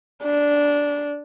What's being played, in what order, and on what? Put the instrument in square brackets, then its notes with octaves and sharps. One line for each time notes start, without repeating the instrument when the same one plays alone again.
[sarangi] D4